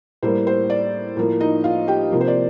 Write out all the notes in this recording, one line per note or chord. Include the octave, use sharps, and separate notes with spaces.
A2 G3 A#3 C5
C5
D5
A2 F3 A#3
D#4 D#5
F4 F5
G4 G5
C3 F3 A#3
C5
D5